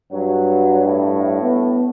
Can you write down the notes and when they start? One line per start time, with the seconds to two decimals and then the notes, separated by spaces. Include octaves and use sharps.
0.12 G2 F#3
0.85 A2
1.41 B3